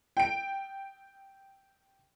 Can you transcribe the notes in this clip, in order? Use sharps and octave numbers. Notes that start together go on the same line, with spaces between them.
G5 D7